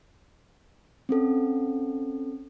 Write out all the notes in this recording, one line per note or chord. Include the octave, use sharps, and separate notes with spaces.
C4 C#4 A4